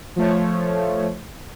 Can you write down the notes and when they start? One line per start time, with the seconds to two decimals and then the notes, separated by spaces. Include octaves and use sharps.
0.16 F3 A3 C#5